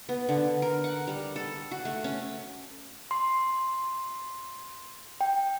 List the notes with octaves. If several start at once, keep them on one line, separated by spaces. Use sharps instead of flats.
B3
D3
A#4
F#5
G3
A4
F#4
A3
C#4
C6
G5